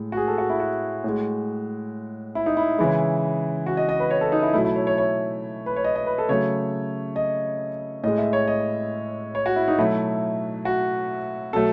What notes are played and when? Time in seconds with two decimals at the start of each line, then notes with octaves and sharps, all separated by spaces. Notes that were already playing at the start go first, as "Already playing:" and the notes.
Already playing: A2 G#3
0.12 F#4
0.17 G#4
0.28 A4
0.38 F#4
0.50 E4
0.60 F#4
1.04 A2 G#3
2.35 E4
2.46 D#4
2.57 E4
2.79 C#3 E3 G#3 E4
3.66 F#4
3.77 D#5
3.89 D#5
4.00 B4
4.11 C#5
4.21 A4
4.32 D#4
4.42 E4
4.53 B2 F#3 A3 E4
4.65 E4
4.76 C#5
4.87 C#5
4.98 C#5
5.66 B4
5.76 C#5
5.84 D#5
5.96 D#5
6.06 B4
6.18 A4
6.29 C#3 F#3 A3 C#5
7.16 D#5
8.04 A2 G#3 D#5
8.18 E5
8.33 C#5
8.48 D#5
9.35 C#5
9.46 F#4
9.56 E4
9.68 D#4
9.79 B2 F#3 A3 E4
10.65 F#4
11.53 B2 F#3 A3 A4